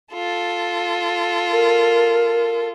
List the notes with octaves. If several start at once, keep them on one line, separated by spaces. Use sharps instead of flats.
F4 A4
A#4